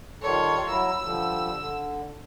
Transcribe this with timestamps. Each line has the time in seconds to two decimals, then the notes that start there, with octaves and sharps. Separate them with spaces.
0.22 D#3 G3 F4 A4 C#5
0.69 F#3 E4 A#5 E6
1.03 D3 F3 G3
1.55 D3